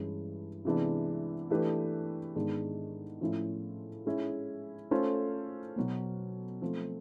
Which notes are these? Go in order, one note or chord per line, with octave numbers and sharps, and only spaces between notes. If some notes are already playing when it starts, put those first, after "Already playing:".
Already playing: G2 E3 G#3 C#4 E4
C3 E3 G#3 B3 D4
E3 A3 D4 G4 B4
G#2 D#3 G#3 B3 D4
A2 F3 A3 C#4 E4
G#3 C#4 E4
A3 C#4 F4 A4 C5
B2 F#3 B3
F3 A3 C4